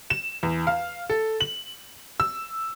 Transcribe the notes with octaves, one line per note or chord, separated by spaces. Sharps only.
E7
E2
F5
A4
F#7
E6